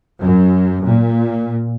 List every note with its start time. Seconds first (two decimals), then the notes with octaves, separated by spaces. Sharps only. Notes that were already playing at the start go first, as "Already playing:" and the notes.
0.21 F#2
0.84 A#2